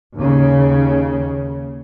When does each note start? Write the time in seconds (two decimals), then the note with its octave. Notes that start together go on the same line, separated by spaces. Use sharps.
0.16 D#2 C#3